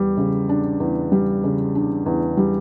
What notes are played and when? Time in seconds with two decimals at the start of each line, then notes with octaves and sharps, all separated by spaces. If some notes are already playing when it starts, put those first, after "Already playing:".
Already playing: E2 G3
0.17 C#3
0.49 D4
0.80 E2
1.12 G3
1.44 C#3
1.75 D4
2.06 E2
2.37 G3